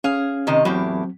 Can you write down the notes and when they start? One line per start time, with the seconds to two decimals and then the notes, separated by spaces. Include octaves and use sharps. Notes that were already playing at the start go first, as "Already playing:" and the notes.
0.04 C#4 G#4 F5
0.47 C3 D#3 D#5
0.65 E2 A2 F#3 C4 G4